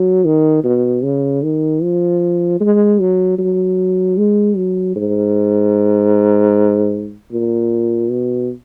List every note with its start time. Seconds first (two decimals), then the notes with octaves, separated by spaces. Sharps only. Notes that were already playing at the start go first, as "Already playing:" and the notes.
Already playing: F#3
0.25 D#3
0.64 B2
1.03 C#3
1.43 D#3
1.82 F3
2.60 G#3
3.00 F#3
3.39 F#3
4.18 G#3
4.57 F#3
4.96 G#2
7.32 A#2
8.10 B2